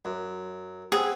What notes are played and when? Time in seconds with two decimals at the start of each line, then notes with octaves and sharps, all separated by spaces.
0.05 F#2
0.92 B3 C4 G#4